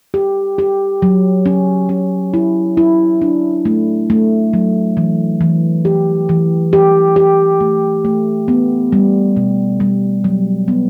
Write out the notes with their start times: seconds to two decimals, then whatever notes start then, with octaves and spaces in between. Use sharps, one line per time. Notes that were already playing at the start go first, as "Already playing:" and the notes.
0.14 G4
0.58 G4
1.02 F#3
1.46 C#4
1.89 C#4
2.34 E4
2.77 E4
3.22 D4
3.65 A3
4.10 A3
4.54 F#3
4.97 E3
5.41 E3
5.85 G4
6.29 E3
6.73 G4
7.16 G4
7.61 A3
8.05 A3
8.48 B3
8.93 G3
9.37 B2
9.80 G3
10.24 F#3
10.68 B3